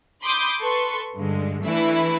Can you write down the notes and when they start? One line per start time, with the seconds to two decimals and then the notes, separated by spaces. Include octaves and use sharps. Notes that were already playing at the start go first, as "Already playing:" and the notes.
0.22 B5 C6 D6 D#6 G6
0.60 A4 B4 C6 C#6
1.15 G2 D3 G#3
1.63 E3 A3 D4 E4 B4